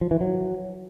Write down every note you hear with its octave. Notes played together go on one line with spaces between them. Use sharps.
F3
E3
F#3